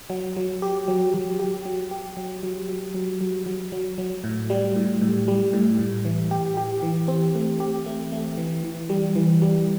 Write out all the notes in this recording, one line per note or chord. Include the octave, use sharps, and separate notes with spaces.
F#3
F#3
G4
F#3
F#3
G4
F#3
G4
F#3
F#3
F#3
F#3
F#3
F#3
F#3
F#3
A2
G3
A2
A2
G3
A2
A2
E3
G4
G4
E3
C4
A3
G4
A3
A3
E3
E3
G3
E3
G3